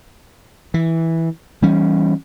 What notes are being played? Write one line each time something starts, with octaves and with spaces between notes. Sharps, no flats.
E3
E3 G3 C#4